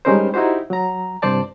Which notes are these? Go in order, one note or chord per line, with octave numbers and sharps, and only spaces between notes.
G3 G#3 C#4 D#4 A#4 C5
D#4 E4 F#4 G4 C5
F#3 A#5
C2 G2 C5 D5 A5